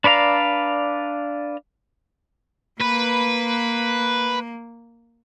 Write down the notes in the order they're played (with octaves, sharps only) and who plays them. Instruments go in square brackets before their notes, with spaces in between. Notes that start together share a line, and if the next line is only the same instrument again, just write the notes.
[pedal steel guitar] D4 B4 D5 F5 A#5
[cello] A#3 [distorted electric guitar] B4